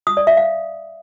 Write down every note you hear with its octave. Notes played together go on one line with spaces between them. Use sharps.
D#6
D5
E5
F5